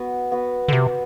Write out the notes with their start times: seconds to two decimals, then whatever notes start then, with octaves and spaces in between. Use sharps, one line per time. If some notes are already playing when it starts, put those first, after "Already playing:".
Already playing: B3 F#4 B4
0.31 B3 F#4 B4
0.68 D3
0.73 C3 B3 F#4 B4